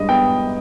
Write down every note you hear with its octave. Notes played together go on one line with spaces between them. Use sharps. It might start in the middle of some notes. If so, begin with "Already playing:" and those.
Already playing: G2 G#3 D#5
B3 G5